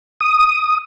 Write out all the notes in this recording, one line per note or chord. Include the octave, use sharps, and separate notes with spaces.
D#6